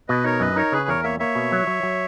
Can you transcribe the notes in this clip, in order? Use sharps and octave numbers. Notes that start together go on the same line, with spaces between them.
B2 B4 D#5
D#4 A#4 C#5
F#2 B4 D#5
D#4 A#4 C#5
C#3 G#4 B4
E2 A#4 C#5
A#3 C#5 E5
A#3 C#5 E5
B2
F#3
F#3
F#3